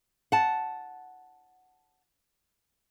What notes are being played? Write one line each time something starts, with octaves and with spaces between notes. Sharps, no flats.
F#5 A5